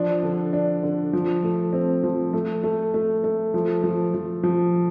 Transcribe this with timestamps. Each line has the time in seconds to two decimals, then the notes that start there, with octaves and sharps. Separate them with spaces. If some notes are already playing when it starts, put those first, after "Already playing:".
Already playing: F3 D4
0.23 D3
0.53 D4
0.83 D3
1.13 F3
1.43 A3
1.73 C4
2.04 F3
2.33 A3
2.64 A3
2.94 A3
3.24 A3
3.54 F3
3.84 F3
4.14 F3
4.43 F3